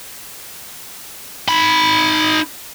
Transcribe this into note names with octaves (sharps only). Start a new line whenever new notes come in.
D#4 B5